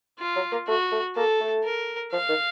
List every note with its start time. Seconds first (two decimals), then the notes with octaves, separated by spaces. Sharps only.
0.19 F4
0.36 F#3
0.52 A#3
0.68 A3 F#4
0.92 A3
1.16 A#3 A4
1.40 A3
1.64 A#4
2.12 F3 F5
2.29 D#3